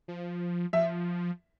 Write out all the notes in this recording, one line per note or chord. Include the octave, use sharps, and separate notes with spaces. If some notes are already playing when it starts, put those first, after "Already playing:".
F3
F3 E5